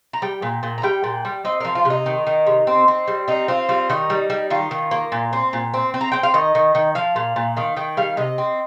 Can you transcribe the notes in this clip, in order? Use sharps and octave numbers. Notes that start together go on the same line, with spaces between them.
A#5
G3 G5
A#2
A#2
A#5
G3 G5
A#2
G3
C4 D#5
F3 A#4
F4
C3
D#4
D#3
D#3
C3
C4
C4
G3
C4 D#4
C4 F4
G3 F4
D#3 D#4
G3
G3
D#3 F4
D#3
A#3
A#2
C4
A#2
C4
C4
A#5
C4 G5
F5
D#3 D#5
D#3
D#3
F3 F5
A#2
A#2
D#3 F5
D#3 G5
G3 F5
C3 D#5
C4